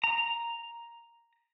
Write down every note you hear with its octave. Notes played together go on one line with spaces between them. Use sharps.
A#5